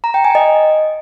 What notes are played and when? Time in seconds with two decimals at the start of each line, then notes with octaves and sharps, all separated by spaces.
0.04 A#5
0.14 G5
0.25 G#5
0.35 D#5